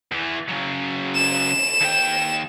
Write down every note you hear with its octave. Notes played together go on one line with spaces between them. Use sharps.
E2 E3
C#3 F#3
E7
D#2 G5